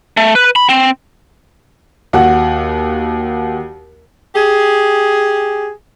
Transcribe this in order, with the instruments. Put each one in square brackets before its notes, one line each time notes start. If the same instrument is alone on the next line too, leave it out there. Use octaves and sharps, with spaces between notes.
[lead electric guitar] A3
B4
B5
C4
[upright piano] D#2 F#4 F#5
[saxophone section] G4 G#4